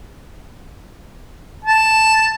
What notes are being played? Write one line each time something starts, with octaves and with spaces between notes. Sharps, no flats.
A5